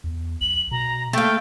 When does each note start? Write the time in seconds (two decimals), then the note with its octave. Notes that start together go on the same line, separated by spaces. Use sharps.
0.04 E2
0.41 B1 F#7
0.71 B2 A#5
1.13 A3 A#3 F5 G5